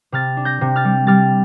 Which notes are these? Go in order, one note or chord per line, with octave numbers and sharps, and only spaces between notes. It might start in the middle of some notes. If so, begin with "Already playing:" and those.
C3 F6 A6
D4
G6 A#6
C3
F6 A6
G3
G3 F6 A6